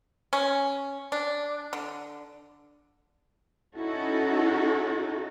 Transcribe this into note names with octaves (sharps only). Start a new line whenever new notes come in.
C#4
D4
D3
C#4 D#4 E4 F#4 A4